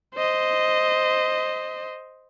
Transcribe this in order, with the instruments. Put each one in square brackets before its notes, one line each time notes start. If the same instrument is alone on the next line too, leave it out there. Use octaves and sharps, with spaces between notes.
[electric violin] C5 D#5